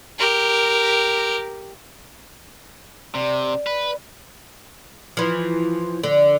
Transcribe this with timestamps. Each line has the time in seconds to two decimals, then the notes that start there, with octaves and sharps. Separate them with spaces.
0.18 G4 A#4
3.15 C3 D5
3.67 B4
5.17 E3 F3
6.03 D3